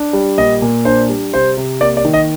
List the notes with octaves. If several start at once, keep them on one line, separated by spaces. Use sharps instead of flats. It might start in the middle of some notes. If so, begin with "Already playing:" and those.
Already playing: D4
G3
A#2 D#5
A#2
D4 C5
G3
C3 C5
C3
A#3 D5
D5
D#3
D#5